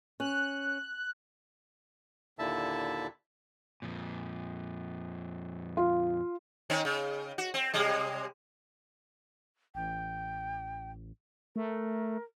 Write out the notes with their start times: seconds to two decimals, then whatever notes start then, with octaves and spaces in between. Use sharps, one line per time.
0.20 C#4 F#6
2.39 D#2 A#2 D3 E4 E5 A5
3.82 F2 A#2
5.77 F4
6.70 D#3 C4 C#4
6.85 C#3
7.38 F#4
7.54 C4
7.74 C3 G3 G#3
9.75 A1 G5
11.56 A3 A#4